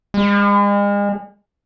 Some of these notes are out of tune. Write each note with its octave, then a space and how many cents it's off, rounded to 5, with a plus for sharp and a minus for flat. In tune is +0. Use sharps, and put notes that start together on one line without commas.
G#3 -40